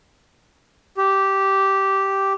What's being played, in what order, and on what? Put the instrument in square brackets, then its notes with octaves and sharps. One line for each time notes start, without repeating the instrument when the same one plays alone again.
[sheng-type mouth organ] G4